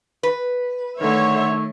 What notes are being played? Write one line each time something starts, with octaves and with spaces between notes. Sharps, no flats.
B4
D3 D#3 A3 A4 C#5 E5